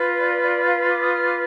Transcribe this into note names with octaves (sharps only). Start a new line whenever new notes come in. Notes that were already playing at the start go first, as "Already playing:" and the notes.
Already playing: F4 B4
D5
D5
F5
C6
D6
D#6
F6
D6